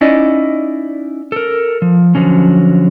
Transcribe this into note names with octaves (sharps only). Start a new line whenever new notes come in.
C#4 D#4 E4 D5 D#5
A4 A#4
F3
D3 F3 F#3 C#4